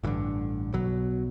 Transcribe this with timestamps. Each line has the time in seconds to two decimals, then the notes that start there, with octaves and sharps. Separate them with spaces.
0.03 A1 G2 D3 E3
0.73 B1 B2 F#3